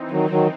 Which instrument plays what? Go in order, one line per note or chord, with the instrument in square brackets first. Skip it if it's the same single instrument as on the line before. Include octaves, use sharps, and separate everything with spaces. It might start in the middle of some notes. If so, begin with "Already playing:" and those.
Already playing: [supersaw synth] E3 C4 D#4
[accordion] D#3 F#3
D#3 F#3